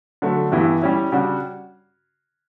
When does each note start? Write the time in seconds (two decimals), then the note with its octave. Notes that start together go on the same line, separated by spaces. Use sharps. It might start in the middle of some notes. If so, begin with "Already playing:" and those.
0.22 D3 F#3 A3
0.51 G2 E3 B3 E4 G4
0.82 G3 C#4 E4
1.12 C#3 G3 D4 F#4